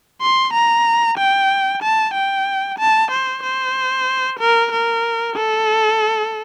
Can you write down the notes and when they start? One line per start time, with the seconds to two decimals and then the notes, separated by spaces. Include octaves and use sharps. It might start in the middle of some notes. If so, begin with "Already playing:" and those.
0.21 C6
0.53 A#5
1.18 G5
1.83 A5
2.14 G5
2.79 A5
3.11 C5
3.43 C5
4.39 A#4
4.72 A#4
5.36 A4